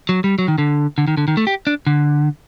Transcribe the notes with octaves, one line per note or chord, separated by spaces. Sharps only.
F#3
G3
F#3
D#3
D3
D3
D#3
D3
D#3
A3
G4
D4
D3